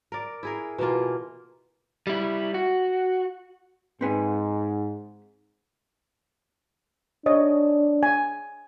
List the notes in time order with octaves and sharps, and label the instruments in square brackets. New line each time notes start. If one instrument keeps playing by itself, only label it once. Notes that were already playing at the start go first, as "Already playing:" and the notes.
[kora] A#4 D5
E4 G#4 A#4
B2 E3 A#3 F4
[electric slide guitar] G3 E4
F#4
[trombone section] G#2 [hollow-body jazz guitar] C4 B4 G#5
[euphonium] D4 [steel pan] C#5 D#5
[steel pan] G#5